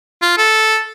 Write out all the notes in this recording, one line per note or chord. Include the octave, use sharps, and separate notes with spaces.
F4
A4